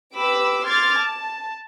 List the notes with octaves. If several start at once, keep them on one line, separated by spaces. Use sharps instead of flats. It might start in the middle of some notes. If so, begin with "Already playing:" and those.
G4 B4 B5 D6 E6
C6 D6 F6 G#6 A6
A5